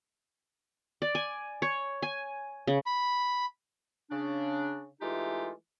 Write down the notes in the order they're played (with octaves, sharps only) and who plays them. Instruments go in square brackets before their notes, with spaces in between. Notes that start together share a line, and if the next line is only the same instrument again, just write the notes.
[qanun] D5
G#5
C#5
G#5
C#3
[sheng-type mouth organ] B5
[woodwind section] C#3 D4
E3 G#3 A3 D#4 F4 G4